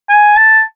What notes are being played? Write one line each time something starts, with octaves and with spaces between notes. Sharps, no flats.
G#5
A5